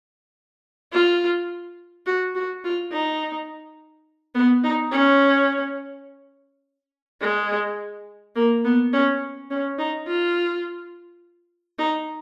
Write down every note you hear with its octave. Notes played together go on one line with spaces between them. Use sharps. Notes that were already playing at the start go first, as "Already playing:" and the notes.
F4
F#4
F#4
F4
D#4
B3
D#4
C#4
G#3
A#3
B3
C#4
C#4
D#4
F4
D#4